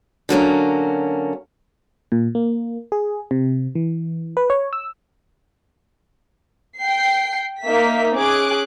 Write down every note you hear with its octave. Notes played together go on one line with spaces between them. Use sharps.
D3 F#3 A#3 C#4
A#2
A#3
G#4
C3
E3
B4
C#5
E6
G5 C7
A#3 D#4 E5 B6
C#4 G#4 D6 F#6 D7